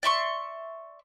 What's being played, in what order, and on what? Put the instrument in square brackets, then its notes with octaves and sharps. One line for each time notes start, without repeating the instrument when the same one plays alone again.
[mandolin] D5 E5 C6 C#6